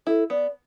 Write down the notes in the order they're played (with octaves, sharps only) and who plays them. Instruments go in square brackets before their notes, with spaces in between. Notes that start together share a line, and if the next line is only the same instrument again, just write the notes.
[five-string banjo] E4 [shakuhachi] A4
[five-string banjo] B3 [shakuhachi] D5